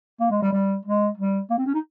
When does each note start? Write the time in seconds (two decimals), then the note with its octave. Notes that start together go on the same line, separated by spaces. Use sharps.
0.20 A#3
0.31 G#3
0.42 G3
0.53 G3
0.85 G#3
1.17 G3
1.50 A#3
1.58 C4
1.66 C#4
1.74 D#4